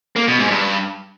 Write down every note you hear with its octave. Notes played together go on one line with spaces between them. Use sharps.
A#3
B2
G#2
G2